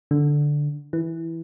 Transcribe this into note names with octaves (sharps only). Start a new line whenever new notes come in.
D3
E3